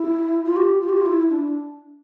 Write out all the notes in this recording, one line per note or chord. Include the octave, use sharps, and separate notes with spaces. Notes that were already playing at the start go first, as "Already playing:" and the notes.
Already playing: E4
F4
G4
F4
G4
F4
E4
D4